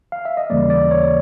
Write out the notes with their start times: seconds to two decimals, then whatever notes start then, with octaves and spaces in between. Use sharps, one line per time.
0.12 F5
0.25 E5
0.37 D#5
0.50 D#2 C#3 E3 G3 A#3 D5
0.70 D5
0.91 C#5